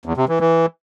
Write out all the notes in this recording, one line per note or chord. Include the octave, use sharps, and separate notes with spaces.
E2
C3
E3
E3